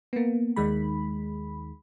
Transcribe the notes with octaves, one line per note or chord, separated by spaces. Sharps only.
A#3 B3
D#2 D#3 G#3 B5